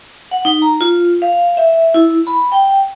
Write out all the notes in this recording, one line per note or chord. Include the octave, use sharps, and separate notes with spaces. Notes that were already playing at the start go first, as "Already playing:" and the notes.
F#5
D#4
A#5
F4
F5
E5
E4
B5
G5